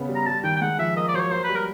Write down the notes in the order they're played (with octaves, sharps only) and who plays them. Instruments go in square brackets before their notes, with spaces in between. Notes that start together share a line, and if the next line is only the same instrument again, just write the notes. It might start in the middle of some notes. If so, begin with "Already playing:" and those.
Already playing: [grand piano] C#3 B3
G3
[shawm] A#5
[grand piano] G3 [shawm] A5
[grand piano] D#3 [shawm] G5
[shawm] G5
[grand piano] G#3 [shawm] F#5
[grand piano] F3 [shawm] E5
[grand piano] A#3 [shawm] D#5
[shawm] D5
[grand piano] F#3 [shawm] C5
[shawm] C#5
[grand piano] A#3 [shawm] C5
[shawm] B4
[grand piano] G3
[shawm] A#4